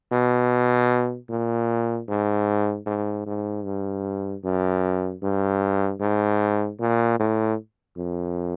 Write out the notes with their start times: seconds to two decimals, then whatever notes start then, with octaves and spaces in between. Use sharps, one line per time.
0.12 B2
1.30 A#2
2.09 G#2
2.86 G#2
3.26 G#2
3.65 G2
4.44 F#2
5.23 G2
6.00 G#2
6.80 A#2
7.19 A2
7.97 F2